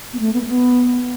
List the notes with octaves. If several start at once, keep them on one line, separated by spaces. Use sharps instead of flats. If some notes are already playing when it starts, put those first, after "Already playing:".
B3
A3
B3
A3
B3